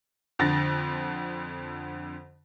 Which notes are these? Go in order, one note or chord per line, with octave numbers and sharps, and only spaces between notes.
F2 D3 A6 A#6